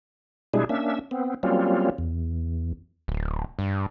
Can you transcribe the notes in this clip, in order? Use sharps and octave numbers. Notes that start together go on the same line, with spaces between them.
B2 G3 G#3 D4 E4 G#4
A#3 C#4 D4 E5
B3 C4
F#3 G3 A#3 C4 C#4 F4
E2
D1
G2